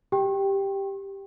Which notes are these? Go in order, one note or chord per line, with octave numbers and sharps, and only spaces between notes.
G4 G5